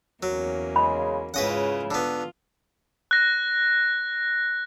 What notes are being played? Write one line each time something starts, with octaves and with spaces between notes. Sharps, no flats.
E2 F#3 A#3 C#4
C#3 G#3 B5
G#2 C#3 E4 F4 B4 D#5 F#5
D3 B3 F4
F#6 A#6